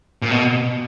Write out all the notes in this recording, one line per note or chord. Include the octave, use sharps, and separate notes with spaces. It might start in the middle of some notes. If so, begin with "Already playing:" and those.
A#2
B2